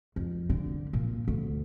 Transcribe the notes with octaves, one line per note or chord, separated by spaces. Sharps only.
F2
D3
A#2
D2